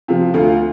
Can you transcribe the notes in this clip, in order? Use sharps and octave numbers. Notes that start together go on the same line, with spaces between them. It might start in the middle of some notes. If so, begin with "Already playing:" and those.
C3 F3 F4
D2 F4